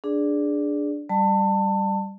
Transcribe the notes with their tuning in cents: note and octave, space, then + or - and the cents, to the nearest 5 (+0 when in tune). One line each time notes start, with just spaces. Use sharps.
D4 +0 G#4 +0 D5 +0
G3 +0 D5 +35 A5 +25